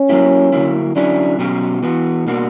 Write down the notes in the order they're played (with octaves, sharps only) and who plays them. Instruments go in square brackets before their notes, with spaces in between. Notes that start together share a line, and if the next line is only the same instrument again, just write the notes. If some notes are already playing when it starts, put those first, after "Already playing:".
Already playing: [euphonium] C#4
[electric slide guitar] F#3 A#3 E4 G4
D3 F#3 A#3 E4
[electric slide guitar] D3 F#3 C#4 E4 [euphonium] D4
[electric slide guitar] B2 F#3 C#4 G4
E3 B3 F#4
B2 A#3 D4 F#4